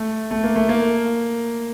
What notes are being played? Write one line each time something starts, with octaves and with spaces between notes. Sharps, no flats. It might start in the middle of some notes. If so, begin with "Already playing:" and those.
Already playing: A3
A3
A#3
A3
A#3